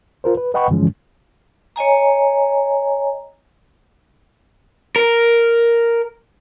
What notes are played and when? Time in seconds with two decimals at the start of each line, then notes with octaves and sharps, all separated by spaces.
0.24 F4 A#4 C5
0.37 B4
0.54 B4 D#5 F#5 G5 B5 C#6
0.69 G2 D3 E3 F3 G#3 C#4
1.76 C#5 D#5 G#5 A#5
4.96 A#4